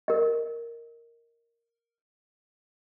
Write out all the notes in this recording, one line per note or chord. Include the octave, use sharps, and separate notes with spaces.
A#4 D#5